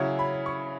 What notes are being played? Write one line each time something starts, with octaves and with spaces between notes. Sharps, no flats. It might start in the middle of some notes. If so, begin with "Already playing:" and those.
Already playing: C#3 F#3 C#4 E4
B5
C#6